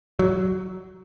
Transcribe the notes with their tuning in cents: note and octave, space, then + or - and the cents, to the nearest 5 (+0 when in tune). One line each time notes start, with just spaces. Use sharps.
F#3 +15